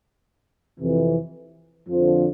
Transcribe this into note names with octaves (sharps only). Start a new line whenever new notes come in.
F2 C3 E3
F2 D3 F3